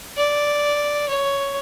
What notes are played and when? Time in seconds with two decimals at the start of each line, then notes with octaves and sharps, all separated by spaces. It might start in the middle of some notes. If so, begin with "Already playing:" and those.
0.17 D5
1.08 C#5